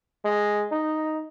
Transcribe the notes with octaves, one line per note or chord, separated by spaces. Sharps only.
G#3
D#4